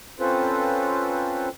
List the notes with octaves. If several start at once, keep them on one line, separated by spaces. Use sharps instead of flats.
C4 C#4 F4 A4 B4 C5